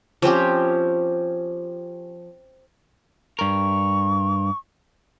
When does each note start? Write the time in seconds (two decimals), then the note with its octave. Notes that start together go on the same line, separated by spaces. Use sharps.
0.22 F3 C4 C#4 G4
3.39 G2 A#4 C#6